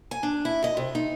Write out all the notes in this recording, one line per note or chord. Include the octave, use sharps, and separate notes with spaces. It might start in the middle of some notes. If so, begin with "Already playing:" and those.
G#5
D4
E4
D#5
C3
D#4